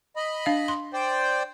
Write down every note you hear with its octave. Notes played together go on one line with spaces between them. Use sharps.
D#5 B5
D4 F5
C6
C5 D5 G5